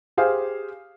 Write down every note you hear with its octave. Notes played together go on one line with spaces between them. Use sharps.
G4 G#4 C5 F5